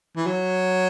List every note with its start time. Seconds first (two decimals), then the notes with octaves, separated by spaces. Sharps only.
0.16 E3
0.26 F#3